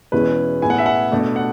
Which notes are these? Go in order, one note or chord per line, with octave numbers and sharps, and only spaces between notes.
E2 B2 G#3 C#4 E4 B4
A2 G#3 B3 E4 G#5
F#5
E5
F#5
B2 A3 D4
F#5